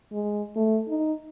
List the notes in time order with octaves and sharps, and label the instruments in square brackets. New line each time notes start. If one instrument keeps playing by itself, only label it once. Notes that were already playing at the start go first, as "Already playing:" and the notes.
[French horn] G#3
A3
D#4